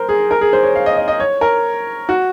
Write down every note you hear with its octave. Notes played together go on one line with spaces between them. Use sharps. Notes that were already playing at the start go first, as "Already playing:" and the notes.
Already playing: A#4 C5
G#4
A#4
G#4
C5
C#5
F5
D#5
D#5
D#5
C#5
A#4
F#4